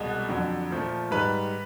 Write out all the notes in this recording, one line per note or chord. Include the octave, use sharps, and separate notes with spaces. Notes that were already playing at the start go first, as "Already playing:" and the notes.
Already playing: C2 B2 G#3
F2 D3 F#3
A#2 F3 A3
G#2 D#3 G3 B4 B5